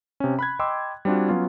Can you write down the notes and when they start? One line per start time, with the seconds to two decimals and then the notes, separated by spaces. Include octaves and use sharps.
0.20 C3 C#4
0.39 B5 F#6 G#6
0.59 D#5 G5 B5 C6 D6 E6
1.05 G3 C4 D4 F4 F#4
1.29 F#3 B3 C#4 F4